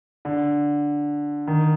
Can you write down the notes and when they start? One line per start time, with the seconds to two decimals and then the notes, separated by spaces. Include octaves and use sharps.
0.25 D3
1.47 D#3